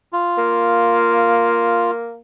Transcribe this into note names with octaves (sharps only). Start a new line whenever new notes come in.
F4
A#3